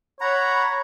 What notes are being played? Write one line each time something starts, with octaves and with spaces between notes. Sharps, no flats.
C#5 F#5 A#5 B5